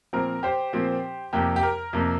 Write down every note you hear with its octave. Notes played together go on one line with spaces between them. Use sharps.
A#2 F3 C4 A#4
G4 C5
A#2 F3 C4
F2 C3 A#3 G4
G4
A#4
F2 C3 A#3